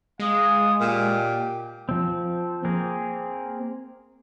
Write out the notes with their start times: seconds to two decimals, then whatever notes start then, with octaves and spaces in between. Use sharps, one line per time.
0.19 G#3 F5 D#6
0.80 A#2 G4
1.89 F3 C4
2.64 A#3 C4 G#4 A#4